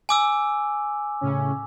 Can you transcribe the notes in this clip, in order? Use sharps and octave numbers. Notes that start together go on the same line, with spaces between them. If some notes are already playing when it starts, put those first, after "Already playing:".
G#5 D6 E6
A2 C#3 C#4